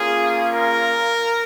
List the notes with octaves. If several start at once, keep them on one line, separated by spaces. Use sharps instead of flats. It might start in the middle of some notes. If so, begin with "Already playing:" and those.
Already playing: A#3 C#4 F4 G#4
A#4